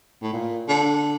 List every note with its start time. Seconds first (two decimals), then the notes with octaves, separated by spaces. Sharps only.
0.22 A2
0.33 A#2
0.68 D3